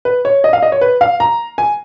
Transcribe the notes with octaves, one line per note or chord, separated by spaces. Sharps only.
B4
C#5
D#5
F5
D#5
C#5
B4
F5
A#5
G#5